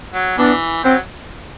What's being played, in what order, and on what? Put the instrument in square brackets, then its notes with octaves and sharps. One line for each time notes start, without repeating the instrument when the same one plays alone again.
[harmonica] F#3
[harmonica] E3 [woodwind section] B3 D4
[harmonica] F#3 [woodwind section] C4